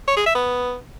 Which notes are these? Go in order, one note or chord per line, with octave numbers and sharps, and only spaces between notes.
C#5
G#4
E5
B3